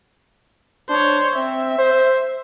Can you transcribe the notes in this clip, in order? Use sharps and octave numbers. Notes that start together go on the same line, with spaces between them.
D4 C5 C#5
C4 E5
C5